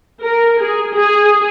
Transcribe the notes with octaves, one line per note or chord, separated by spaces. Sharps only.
A#4
G#4
G#4